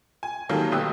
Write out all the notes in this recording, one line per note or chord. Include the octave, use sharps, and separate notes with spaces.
G#5
D#3 F#3 G3 A#3 A4
F1 B2 G4 D#6 E6 F#6